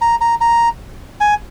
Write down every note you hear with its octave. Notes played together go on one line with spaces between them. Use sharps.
A#5
A#5
A#5
G#5